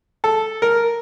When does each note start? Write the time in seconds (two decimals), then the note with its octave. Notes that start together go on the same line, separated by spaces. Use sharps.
0.24 A4
0.62 A#4